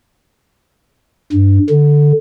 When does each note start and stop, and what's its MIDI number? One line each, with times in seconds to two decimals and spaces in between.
1.32 1.59 43
1.70 2.12 50